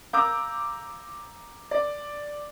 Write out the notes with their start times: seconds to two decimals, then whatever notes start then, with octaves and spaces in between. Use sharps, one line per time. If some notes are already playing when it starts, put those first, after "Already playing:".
0.13 F5 A#5 D6 E6 G6
1.71 D5